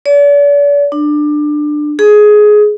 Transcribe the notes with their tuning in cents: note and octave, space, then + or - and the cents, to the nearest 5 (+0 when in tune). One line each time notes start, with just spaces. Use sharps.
D5 -40
D4 +20
G#4 +15